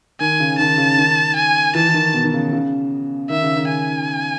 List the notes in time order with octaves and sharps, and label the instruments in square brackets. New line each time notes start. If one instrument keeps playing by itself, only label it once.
[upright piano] D#3 [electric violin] G#5
[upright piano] C#3
[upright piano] D#3 [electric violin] A5
[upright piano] C#3
D#3
[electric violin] G#5
[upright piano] E3 [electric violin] A5
[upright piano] E3
D#3
B2
D#3
C#3
C#3
[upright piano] D#3 [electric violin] E5
[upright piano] C#3
D#3
[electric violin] G#5